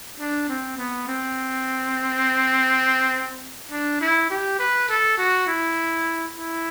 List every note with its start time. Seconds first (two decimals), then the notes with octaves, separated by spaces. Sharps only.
0.20 D4
0.48 C4
0.78 B3
1.08 C4
3.71 D4
4.01 E4
4.30 G4
4.59 B4
4.89 A4
5.18 F#4
5.47 E4
6.36 E4